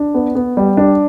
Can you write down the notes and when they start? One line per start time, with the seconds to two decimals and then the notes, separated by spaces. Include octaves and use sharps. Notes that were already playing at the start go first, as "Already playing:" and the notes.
Already playing: D4
0.14 B3
0.35 B3
0.57 G3
0.77 D4